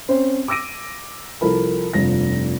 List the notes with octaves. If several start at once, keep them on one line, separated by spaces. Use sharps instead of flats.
C4 C#4 C5
D6 E6 A#6 D7 D#7
C2 F3 A4 A#4 B5
F1 G2 F3 A#6